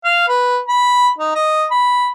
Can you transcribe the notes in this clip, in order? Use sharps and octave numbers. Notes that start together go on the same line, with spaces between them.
F5
B4
B5
D#4
D#5
B5